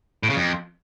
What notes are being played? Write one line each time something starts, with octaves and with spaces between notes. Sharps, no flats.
A2
C#3
F2